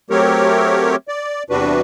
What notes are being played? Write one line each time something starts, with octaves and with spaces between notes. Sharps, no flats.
F#3 A3 C4 G4 A#4 C#5
D5
E2 C3 G3 D4 F#4 B4